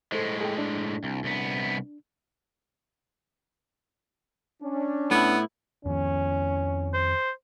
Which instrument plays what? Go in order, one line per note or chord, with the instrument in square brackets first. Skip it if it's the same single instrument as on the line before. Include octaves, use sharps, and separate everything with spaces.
[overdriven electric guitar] A2 G#3 [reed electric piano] A4 C5
[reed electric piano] G#4 A4 G5
D4
[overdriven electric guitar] C2
C2 B3
[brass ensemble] C#4 D4
[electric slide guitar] A2 E4 [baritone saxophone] B3
[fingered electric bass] F2 D#3 F3 [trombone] C#4
[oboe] C5